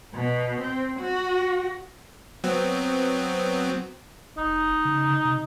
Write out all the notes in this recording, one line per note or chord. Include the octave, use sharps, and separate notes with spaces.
B2
C4
F#4
F#3 B3 C4
F1 D#4
C#3
C3